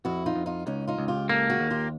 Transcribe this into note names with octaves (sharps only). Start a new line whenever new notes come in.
F2 E4 F#4
D#4 F4
F2
D#4 F4
C#2 C#4 D#4
D#4 F4
C#2
F4 G4
A#3 G4 A4
F#4 G#4
D#2
F4 G4